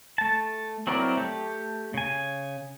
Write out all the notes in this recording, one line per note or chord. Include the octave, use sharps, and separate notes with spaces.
A3 A5
F#3 C4 E4 A#4 D5
A3 G4
C#3 G#5